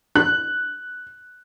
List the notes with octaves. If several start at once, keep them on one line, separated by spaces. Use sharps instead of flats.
F#6